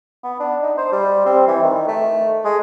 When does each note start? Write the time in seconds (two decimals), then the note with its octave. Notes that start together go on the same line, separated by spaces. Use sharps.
0.24 B3
0.40 D4
0.62 D#4
0.78 C5
0.92 G3
1.26 C4
1.48 E3
1.63 D#3
1.88 A3
2.45 G#3